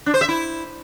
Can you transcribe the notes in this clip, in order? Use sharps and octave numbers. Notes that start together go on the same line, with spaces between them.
D4
C5
E5
E4